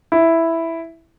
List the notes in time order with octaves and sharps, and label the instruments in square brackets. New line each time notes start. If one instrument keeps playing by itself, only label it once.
[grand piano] E4